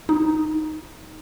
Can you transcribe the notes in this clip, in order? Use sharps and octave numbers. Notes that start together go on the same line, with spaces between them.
D#4